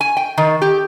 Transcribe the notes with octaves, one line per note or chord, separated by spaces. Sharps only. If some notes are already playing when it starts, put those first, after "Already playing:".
G#5
G5
D#3
G4